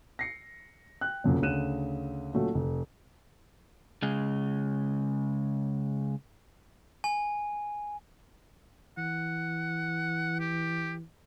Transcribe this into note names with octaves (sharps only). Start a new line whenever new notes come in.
A#6 C7 C#7
G5 F#6
F1 F#2 A#2
D2 C#3 F#6 D#7 E7
A#2 F#3 A3 C#4
F1
C#3 G#3
G#5
E3 F#5
G4